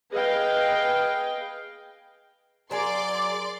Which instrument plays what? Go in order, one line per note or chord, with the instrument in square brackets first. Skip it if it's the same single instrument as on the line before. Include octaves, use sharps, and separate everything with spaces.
[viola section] G#4 B4 D#5 F5 G5
[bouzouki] F#3 G#4 A#4 [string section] D5 C6 D6